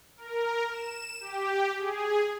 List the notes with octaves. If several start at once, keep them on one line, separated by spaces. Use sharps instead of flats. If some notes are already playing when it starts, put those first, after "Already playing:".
A#4
E7
G4
G#4